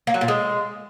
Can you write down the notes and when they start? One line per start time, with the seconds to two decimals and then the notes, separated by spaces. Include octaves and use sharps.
0.07 A#3
0.14 F#3
0.21 A#2
0.28 G#3